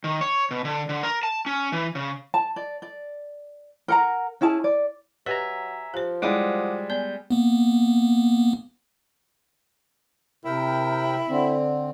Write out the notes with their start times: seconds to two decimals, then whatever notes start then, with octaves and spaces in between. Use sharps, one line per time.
0.04 D#3
0.21 C#5
0.51 B2
0.65 D3
0.89 D3
1.03 A#4
1.23 A5
1.46 C#4
1.72 E3
1.95 C#3
2.34 A5
2.56 D5
2.82 D5
3.88 A#4 F#5 A#5
4.41 C#4 E4 G#4 A5
4.64 D5
5.26 F#3 G4 B4 D#5 E5 G#5 A#5
5.94 F3 G4 C5
6.22 G3 G#3 E4 C#5 F5 F#5 D6 D#6
6.90 B3 D5 G#5 G6
7.31 A#3 B3
10.45 C3 E4 A#4 G5
11.29 D3 C4